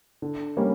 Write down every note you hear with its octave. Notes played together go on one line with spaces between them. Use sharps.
D3
G3 A#3 C#4